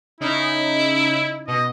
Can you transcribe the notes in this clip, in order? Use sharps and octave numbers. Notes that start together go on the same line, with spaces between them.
C#3 D#4 E4
B2 D#5